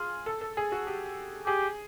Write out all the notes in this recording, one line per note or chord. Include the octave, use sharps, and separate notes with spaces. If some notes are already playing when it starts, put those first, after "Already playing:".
Already playing: F4 G#4
A4
A4
G#4
F#4
G4
G4 G#4